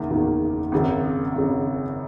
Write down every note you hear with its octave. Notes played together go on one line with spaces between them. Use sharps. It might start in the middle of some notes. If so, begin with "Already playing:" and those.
Already playing: F#1 E2 D#3 A#3
F#1 E2 D#3 A#3
G#1 F#2 C#3
G#1 F#2 C#3